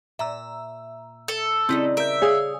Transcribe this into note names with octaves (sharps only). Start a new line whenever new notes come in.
A#2 E5 A#5 E6
A4
C#3 G3 C4 D#4 E4
A#4 E5 G6 D7
G#4 C#5 F5 D#6